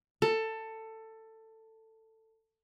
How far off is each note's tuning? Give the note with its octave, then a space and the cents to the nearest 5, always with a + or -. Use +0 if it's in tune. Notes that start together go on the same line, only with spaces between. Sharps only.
A4 +15